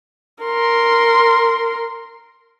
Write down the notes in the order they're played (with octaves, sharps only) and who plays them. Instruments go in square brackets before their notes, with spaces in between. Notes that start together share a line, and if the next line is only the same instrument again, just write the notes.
[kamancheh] A#4 C6